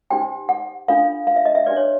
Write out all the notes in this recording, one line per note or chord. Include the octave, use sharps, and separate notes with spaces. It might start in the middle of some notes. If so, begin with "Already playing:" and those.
D#4 G4 C5 G5
F#5
D4 F4 A4 F5
F5
E5
D#5
E5
D4 G4 B4 D5
C#5